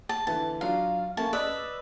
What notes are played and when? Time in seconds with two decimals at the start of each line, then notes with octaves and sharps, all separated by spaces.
0.09 A5
0.27 D3 E3 B3 A5
0.61 F#3 D4 F4 F5
1.17 A3 A#3 C#4 A5
1.33 B4 D5 D#5 E6